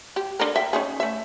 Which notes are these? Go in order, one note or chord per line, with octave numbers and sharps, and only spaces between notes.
G4
D4 A4 A#4
E5 G5
C#4 D#4 G#4
A3 E5